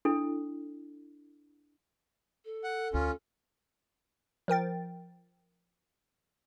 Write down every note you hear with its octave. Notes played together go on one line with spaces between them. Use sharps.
D4 E4 A4
A4
F#5
D2 C#4 F4
F3 A#4 G5 A6